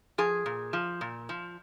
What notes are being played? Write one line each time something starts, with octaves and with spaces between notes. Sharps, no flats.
F3 G#4
A#2
F3
A#2
F3